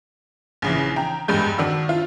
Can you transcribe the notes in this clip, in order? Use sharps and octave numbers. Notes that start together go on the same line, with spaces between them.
A#1 C#3 E3
G5 A#5
E2 G2 G#3 G6
D#3 D4 F#4 E6
F4